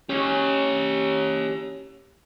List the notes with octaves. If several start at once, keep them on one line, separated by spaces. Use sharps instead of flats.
C#4 G4 C#5